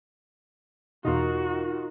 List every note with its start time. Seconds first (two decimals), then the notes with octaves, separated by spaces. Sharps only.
1.05 E2 B2 D#4 F4 F#4 A#4